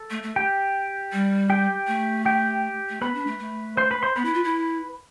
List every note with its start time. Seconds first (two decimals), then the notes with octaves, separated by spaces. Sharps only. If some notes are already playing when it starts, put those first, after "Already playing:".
Already playing: A4
0.11 A3
0.23 A3
0.36 G4 G5
1.12 G3
1.50 G4 G5
1.88 A3
2.25 G4 G5
2.89 A3
3.01 B3 B4 B5
3.15 D4
3.27 A3
3.39 A3
3.77 C5 C6
3.91 B4 B5
4.03 C5 C6
4.16 B3 B4 B5
4.25 E4
4.34 F4
4.44 E4